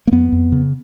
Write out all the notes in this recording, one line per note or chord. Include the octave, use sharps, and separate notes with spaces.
A#3
F2 B3
F2
C#3